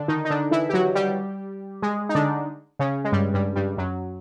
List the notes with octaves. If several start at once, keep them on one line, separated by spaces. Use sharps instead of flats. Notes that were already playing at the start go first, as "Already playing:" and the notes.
Already playing: D3 D4
D#3 D#4
D#4
D3 D4
E3 E4
G4
F#3 F#4
G3 G4
G#3 G#4
D#4
D3 D4
C#3 C#4
G#3
G2 G3
G2 G3
G2 G3
F#2 F#3